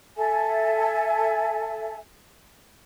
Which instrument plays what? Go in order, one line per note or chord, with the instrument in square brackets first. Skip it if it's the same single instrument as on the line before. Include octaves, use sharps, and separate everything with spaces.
[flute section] A4 E5 G#5